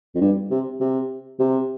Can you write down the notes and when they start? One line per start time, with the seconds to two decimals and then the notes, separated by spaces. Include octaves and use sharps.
0.15 F2
0.21 G2
0.51 C3
0.80 C3
1.39 C3